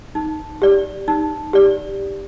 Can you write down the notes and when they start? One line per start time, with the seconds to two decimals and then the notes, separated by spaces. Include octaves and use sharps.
0.15 D#4
0.62 G4 D5
1.08 D#4
1.53 G4 D5